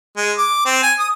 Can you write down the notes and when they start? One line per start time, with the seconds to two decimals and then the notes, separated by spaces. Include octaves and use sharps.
0.17 G#3
0.38 D6
0.66 C4
0.83 G#5
0.99 D#6